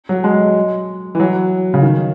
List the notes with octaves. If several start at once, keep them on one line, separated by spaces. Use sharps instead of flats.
F#3
G#3
E3
F#3
C#3
D#3